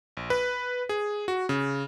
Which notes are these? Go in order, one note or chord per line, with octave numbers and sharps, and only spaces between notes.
A#1
B4
G#4
F#4
C#3